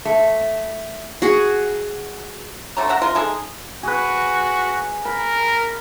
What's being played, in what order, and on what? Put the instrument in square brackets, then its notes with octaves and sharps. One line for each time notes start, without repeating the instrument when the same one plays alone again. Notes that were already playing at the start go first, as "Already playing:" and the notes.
[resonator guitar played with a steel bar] A3
[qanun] F#4 G#4
[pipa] D3 A3 C#4 A#5
E5 F#5 A#5
C3 F4 A#4 C6
G#3 D#4 G#4 A4
[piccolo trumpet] F#4 [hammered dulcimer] G#4 B4
[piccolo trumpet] A#4 [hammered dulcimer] B5